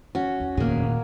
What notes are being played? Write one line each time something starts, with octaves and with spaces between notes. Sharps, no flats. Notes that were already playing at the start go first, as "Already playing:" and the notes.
C#4 F#4
E2
F1 D#2 A#2 A#3 G#4